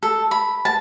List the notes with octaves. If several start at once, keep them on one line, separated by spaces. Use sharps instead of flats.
A4
B5
A5